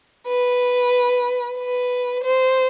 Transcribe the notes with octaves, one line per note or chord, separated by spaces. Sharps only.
B4
B4
C5